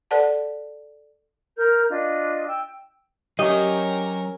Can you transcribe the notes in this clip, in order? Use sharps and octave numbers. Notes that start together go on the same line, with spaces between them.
A4 B4 D5 F#5 A5
A#4 F6 G6
D4 F4 D#5
G5 E6
F#3 C#4 G4 A#4 D#5 G5 A#5